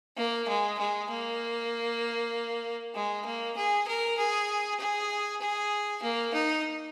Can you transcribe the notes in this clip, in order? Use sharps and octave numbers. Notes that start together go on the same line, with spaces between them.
A#3
G#3
G#3
A#3
G#3
A#3
G#4
A#4
G#4
G#4
G#4
A#3
D#4